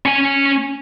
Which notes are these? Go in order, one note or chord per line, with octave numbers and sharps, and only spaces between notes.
C#4 G#5